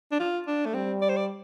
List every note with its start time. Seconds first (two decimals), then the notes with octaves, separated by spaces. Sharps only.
0.11 D4
0.20 F4
0.47 D4
0.66 A3
0.74 G3 C4
1.01 D5
1.09 C5
1.16 D5